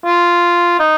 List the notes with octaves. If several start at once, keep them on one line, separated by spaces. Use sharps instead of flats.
F4
D#4